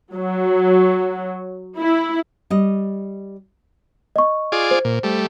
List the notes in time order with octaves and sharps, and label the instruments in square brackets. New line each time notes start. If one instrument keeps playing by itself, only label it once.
[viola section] F#3
E4
[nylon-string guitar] G3 D#5
[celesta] D#5 C#6
[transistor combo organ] F4 G#4 D5
[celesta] C5
[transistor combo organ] A#2
G3 A3